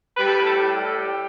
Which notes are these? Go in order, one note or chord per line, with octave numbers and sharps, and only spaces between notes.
G3 B4
A4
A2 B4
A4
A2 G4
G3
A4
G3 G4